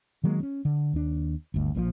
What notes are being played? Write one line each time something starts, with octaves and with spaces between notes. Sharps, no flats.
D#3 F#3 G#3 A#3
C4 C#4
D3
D#2 D4
G1 D2
A#1 A#2 D3 F3